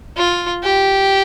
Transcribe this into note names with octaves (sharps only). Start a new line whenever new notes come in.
F4
G4